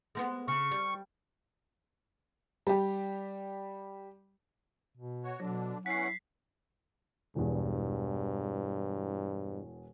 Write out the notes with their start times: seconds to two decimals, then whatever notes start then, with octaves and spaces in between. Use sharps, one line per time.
0.15 G#3 A3 B3
0.48 C#3 C#6
0.71 G3
2.67 G3 G4
4.97 B2
5.24 F#4 C#5
5.40 B2 D3 F#3 D4
5.86 E2 C#4 E4 F#5 B6 C7
7.35 E1 E2 G2